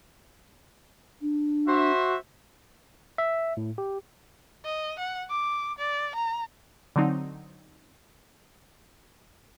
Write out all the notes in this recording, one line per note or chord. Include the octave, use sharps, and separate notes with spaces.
D4
F#4 C5 E5
E5
A2
G4
D#5
F#5
D6
D5
A#5
D3 F#3 C4 D#4